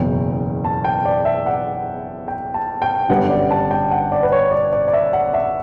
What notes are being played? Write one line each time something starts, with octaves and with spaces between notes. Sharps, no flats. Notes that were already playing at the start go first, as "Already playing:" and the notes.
Already playing: F#1 E2 B2 G5
A5
G5
D5
E5
F#5
G5
A5
G5
G1 F#2 D3 G3 B3 F#5
D5
A5
G5
F#5
D5
B4
C#5
D5
D5
D5
E5
F#5
E5